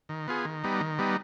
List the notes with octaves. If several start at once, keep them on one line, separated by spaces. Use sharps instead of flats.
D#3
B3 F4 G#4
D#3
G3 B3 D#4
D#3
G3 B3 D#4